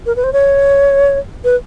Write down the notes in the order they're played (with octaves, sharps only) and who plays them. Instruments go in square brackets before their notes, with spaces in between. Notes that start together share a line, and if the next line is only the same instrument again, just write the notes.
[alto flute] A#4
B4
C5
C#5
B4